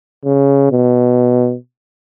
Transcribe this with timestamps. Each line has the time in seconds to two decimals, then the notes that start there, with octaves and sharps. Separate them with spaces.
0.25 C#3
0.72 B2